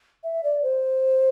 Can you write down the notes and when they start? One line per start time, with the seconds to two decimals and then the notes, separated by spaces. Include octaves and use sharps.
0.24 E5
0.43 D5
0.63 C5